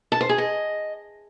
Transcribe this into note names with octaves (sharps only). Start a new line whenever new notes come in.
A5
C5
G#4
D#5